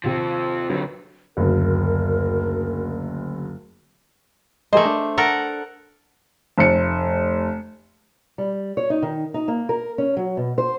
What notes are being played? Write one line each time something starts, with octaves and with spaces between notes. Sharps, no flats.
D#2 C3 F3 C4
F2 D3 D#3 F#3 B4
F#1 D2 A#4
A3 G#4 A#4 C5 D#5
D4
A4 A#4 F#5
F1 C#7
G3
C#5
D#4
D#3
D#4
A#3
A#4
C#4
F#3
B2
C5